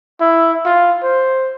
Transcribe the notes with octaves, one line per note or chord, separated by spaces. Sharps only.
E4
F4
C5